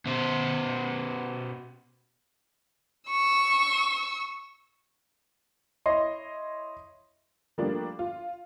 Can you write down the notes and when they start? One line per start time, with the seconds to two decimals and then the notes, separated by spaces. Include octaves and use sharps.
0.06 B2 C5
3.10 C#6 E6
5.86 E4 C#5 D#5 C6
7.58 F3 G3 A3 A#3 D4
7.99 F4